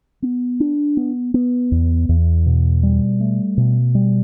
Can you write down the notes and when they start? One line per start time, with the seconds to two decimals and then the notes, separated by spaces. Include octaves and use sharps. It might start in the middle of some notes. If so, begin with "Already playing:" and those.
0.22 B3
0.60 D4
0.97 B3
1.34 B3
1.72 E2
2.09 E2
2.46 B2
2.83 G3
3.20 A3
3.57 B2
3.95 G3